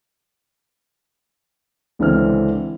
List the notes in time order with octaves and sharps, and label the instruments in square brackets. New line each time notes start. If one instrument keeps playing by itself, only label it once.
[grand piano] C#2 D3 E3 C4 F6